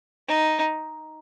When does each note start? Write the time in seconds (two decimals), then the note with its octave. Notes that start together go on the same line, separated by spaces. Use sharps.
0.28 D#4